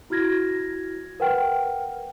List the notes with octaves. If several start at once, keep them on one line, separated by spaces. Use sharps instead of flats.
E4 F#4 F6 G#6 A#6
A#4 B4 F#5 G5 F6